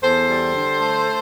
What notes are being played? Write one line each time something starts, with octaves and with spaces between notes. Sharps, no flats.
E2 A4 C5
G3
D3
A3